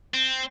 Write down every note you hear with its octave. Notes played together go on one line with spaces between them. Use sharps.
C4